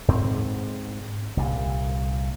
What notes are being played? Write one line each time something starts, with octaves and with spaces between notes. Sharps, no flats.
G#2 C4
C2 A#2